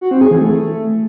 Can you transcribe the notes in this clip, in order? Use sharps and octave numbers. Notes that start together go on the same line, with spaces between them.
F#4
C4
G#4
E3
A3